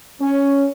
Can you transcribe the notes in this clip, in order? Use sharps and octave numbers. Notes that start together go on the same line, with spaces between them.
C#4